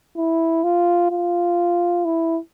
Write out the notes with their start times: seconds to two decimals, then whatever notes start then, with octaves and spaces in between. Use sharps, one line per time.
0.17 E4
0.64 F4
1.11 F4
2.05 E4